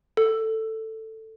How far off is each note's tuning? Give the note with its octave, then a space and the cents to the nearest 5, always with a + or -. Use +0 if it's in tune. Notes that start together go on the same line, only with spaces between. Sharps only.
A4 +10